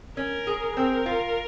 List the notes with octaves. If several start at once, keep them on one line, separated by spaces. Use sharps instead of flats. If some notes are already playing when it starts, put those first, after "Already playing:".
C#4 A#4
G#4
C4 A#4
F4